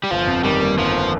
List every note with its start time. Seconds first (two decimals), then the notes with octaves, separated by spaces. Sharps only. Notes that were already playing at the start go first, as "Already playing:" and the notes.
0.04 G3
0.11 G1 F3
0.27 F2
0.44 D#3 G3
0.62 A#3
0.77 G1 F3